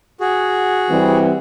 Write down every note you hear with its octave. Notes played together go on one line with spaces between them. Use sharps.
F#4 G#4
E3 G3 C4